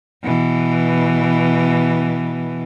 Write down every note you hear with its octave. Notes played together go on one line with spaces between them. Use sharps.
B2 E3